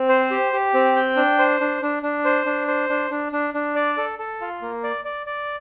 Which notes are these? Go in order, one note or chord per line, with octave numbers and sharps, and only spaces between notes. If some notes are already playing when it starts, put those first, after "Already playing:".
Already playing: C4
C5
G4
G4
C4
G5
D4
C5
D4
D4
D4
C5
D4
C5
D4
D4
D4
D4
D5
A4
A4
F4
A#3
D5
D5
D5